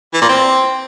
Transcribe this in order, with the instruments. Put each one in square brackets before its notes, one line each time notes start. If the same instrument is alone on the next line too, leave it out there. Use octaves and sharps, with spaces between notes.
[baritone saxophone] E3
A#2
C4